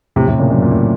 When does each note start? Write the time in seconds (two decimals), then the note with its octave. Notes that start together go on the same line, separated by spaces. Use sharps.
0.16 A2 C3
0.28 A2 C3
0.39 A#2 C#3
0.50 F#2 A#2
0.62 A#2
0.70 A2